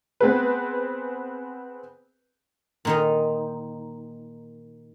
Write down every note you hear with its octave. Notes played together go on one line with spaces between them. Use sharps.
B3 C4 G#4 B4
A#2 D#3 D#4